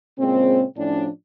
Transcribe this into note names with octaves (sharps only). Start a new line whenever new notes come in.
A#2 C#3 G#3 C4
A2 F3 C#4 D4